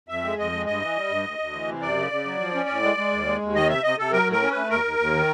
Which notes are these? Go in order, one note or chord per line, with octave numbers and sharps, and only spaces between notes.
F2 E5
G#3
F2 D#5
G#3
G2 D#5
E3
G3
G2
D2
D2
E3
C3
F#2 D5
C#3
C#3
F#3
F3
C#4
A2
G#3
G#3
D#2
G#3
D#2
D#3 D#5
C3 E5
C3 D#5
C3 A4
F#3 A#4
A2
A#4
C#4
A3 B4
D#2 A#4
D#2
D#2
D#3